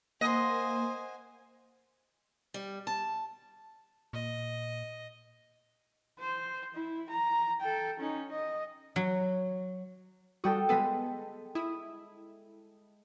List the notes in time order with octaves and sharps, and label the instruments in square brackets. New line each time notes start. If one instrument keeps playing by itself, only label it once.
[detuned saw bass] A#3 [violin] C5 G#5 [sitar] D#5 [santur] F#5 C6
[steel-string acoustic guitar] G3
A5
[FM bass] A#2 [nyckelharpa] D#5
[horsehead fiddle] C5
E4
A#5
A4 G5
C#4 D#4
D#5
[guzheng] F#3
[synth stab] G3 F#4 [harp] A4 G5 D#6
[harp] G#3 B6 D#7 [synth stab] B3 A4
[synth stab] E4 [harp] D#6